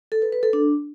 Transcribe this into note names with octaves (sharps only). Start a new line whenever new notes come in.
A4
B4
B4
A4
D4